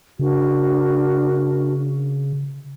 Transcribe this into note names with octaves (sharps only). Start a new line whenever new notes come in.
C#3 D4 F#4 A#4